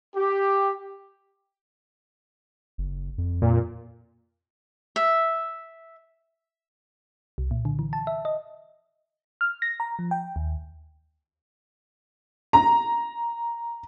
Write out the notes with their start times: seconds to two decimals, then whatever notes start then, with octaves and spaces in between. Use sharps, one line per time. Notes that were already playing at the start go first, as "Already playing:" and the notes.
0.17 G4
2.78 F#1
3.18 F2
3.42 F2 A#2
4.96 E5
7.38 C2
7.51 A#2
7.65 D3
7.79 E3
7.93 A5
8.07 E5
8.25 D#5
9.41 F6
9.62 A#6
9.80 A#5
9.99 F3
10.11 G5
10.36 D#2
12.53 A#5